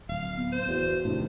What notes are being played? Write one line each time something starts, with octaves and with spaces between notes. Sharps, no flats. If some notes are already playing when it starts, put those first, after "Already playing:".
D1 F5
B3
C5
E2 F#4
A2 C3 D#3 D4